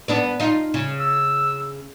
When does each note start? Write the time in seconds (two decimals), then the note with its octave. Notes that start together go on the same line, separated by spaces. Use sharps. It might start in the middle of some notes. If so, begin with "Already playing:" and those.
0.08 B3 D4 B4
0.40 D#4 F4
0.74 C#3
1.00 E6